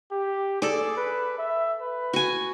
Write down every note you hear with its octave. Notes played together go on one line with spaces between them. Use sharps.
G4
G#4 A4 D5
B4
E5
B4
F#4 G#5